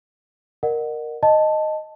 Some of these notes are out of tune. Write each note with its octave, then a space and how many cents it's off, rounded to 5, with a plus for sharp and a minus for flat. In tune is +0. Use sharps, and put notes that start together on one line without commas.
A#4 +0 D#5 -35 F#5 +0
D#5 -5 A5 +0